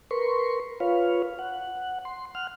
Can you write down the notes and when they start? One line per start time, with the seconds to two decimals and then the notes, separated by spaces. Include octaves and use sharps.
0.11 A#4 B4 C6 C#6
0.80 F4 B4 C#5 F5
1.39 F#5
2.05 C6
2.35 F#5 F6